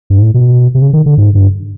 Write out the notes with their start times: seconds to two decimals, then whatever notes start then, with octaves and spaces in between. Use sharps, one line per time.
0.10 G2
0.18 G#2
0.22 A2
0.34 B2
0.75 C3
0.82 C#3
0.93 D#3
1.06 D3
1.17 G#2
1.35 G2